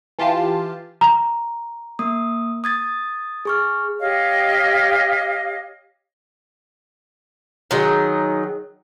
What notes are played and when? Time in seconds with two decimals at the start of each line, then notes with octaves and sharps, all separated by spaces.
0.19 E3 F4 G4 A5 C7
1.01 A#5
1.99 A#3 D#6
2.64 D#6 G#6 A6
3.45 G#4 C#6 F6
4.00 G4 C#5 D#5 F5
7.71 D#3 F#3 G#4